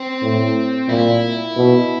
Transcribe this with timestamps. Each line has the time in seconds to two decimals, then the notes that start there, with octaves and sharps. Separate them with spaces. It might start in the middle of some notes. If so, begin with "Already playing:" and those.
Already playing: C4
0.23 A2
0.88 A#2 E4
1.56 B2